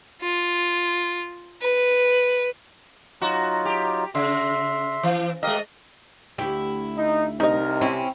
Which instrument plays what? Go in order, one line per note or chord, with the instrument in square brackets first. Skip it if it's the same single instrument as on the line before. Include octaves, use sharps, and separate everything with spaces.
[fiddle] F4
B4
[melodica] F#3 D#4 F4 [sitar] F#4
[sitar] G4
[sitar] C#3 [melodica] E5 C6
[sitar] E3
[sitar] G#3 D#5 [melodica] G4 A#4 F5
[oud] D2 G4 [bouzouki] E4
[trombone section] D#4
[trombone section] C2 C3 [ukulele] D#4 D#5 [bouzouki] A#4
[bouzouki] C4 C#4 [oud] E4